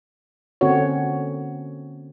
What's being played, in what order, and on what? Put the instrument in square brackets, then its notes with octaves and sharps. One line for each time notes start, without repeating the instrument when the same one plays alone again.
[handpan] D3 A#3 C4 C#4 F#4 C#5